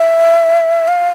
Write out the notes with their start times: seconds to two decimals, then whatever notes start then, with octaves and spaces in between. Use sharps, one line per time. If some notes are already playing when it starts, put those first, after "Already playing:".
Already playing: E5
0.88 F5